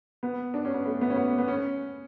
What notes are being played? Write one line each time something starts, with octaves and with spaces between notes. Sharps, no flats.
B3
D4
C#4
B3
A3
B3
C#4
B3
B3
C#4